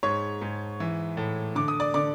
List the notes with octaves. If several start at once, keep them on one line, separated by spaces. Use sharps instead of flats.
G#2 C#5 C#6
G#2
E3
A2
D3 D6
D#6
D5 D6
D3 D5 D6